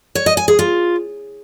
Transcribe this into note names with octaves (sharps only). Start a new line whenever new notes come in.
C#5
D#5
G#5
G#4
F4